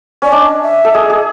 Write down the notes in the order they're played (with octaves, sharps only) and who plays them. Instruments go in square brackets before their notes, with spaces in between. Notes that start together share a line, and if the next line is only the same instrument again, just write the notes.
[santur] C#4 [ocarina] D5
[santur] D4 [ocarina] D#5
[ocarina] E5
[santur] A4
[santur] G#4 [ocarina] D#5
[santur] G#4